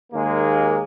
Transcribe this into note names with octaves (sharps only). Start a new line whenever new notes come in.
D#2 G#3 A#3